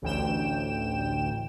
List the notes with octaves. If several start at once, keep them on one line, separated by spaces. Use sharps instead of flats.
A1 D2 G5 E7